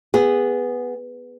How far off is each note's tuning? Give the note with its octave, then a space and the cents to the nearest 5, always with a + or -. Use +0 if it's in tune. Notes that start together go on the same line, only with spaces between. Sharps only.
B3 +0 G#4 -20